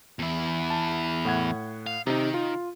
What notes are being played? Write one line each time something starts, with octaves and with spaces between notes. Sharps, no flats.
E2 E4
A5
A2 F#5 G#6
F5
C3 D#3 D#4
F4